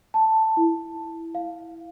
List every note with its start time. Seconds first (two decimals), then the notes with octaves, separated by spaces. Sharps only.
0.14 A5
0.57 E4
1.35 F5